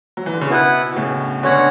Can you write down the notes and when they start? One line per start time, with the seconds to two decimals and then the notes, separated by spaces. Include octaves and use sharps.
0.17 F#3
0.26 E3
0.34 D3
0.41 C#3
0.49 B2 B3 E4 B4 F#5
0.92 B2
0.96 A2 C#3
1.43 B2 D3 C#4 F#4 C#5 F#5